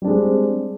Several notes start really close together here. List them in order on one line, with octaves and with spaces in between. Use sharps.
G3 D4 G#3 C4